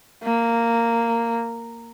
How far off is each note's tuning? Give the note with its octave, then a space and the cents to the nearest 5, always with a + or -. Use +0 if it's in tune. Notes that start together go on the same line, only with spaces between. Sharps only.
A#3 -10